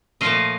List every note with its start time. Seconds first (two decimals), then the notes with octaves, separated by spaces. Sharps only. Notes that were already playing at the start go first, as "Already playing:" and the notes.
0.21 A#2 F3 A3 D#5 F5